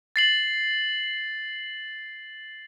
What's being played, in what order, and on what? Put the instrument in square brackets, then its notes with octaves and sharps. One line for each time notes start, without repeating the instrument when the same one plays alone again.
[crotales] A6 C7 F#7